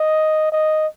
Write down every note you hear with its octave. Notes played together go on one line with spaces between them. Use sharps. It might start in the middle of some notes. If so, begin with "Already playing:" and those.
Already playing: D#5
D#5